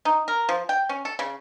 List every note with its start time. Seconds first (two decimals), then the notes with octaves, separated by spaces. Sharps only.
0.05 D#4
0.28 A#4
0.49 F3
0.69 G5
0.89 C#4
1.05 A4
1.19 C#3